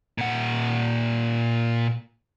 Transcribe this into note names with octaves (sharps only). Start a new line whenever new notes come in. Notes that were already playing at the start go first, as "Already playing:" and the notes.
A#2 F#5